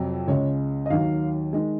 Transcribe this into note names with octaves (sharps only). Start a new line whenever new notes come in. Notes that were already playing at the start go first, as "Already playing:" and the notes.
Already playing: F2 C3 F#3
C#2 C#3 G#3 C#5
D#5
D#2 D#3 F#3 F5
D#3 G#3